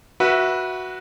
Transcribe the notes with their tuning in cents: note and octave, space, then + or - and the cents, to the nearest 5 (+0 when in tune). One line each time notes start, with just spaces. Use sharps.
F#4 +0 B4 -20 E5 +0